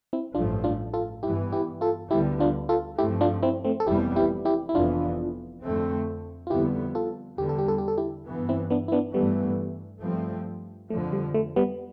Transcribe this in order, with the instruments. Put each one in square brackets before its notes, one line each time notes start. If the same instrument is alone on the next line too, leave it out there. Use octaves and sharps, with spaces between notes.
[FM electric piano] C4 E4
[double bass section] A1 G2 F3 A3 [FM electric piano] D4 F4
[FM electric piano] D4 F4
F4 A4
[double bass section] G2 E3 B3 [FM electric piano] E4 G4
[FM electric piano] E4 G4
F4 A4
[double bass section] D2 D3 G3 B3 [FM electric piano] E4 G4
[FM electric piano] D4 F4
F4 A4
[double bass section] G2 F3 A3 C4 [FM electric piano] E4 G4
[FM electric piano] D4 F4
C4 E4
A3 C4
A4
[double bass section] F1 F2 E3 G3 B3 [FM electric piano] E4 G4
[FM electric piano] E4 G4
E4 G4
E4
[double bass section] F1 F2 E3 B3 [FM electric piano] D4 F4
[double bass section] F2 D3 A3 C4
[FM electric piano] F4
[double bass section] F2 D3 G3 B3 [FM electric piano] E4 G4
[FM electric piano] F4 A4
[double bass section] E2 D3 G3 [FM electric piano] G4
[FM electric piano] A4
G4
A4
G4
A4
E4 G4
[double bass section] G2 E3 B3
[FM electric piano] C4 E4
B3 D4
E4
B3 D4
[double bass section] G2 E3 A3 [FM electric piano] G3 B3
[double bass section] G2 F3 A3 C4
[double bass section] F3 [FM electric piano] A3
[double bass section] F2 D3
[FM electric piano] G3
A3
G3 B3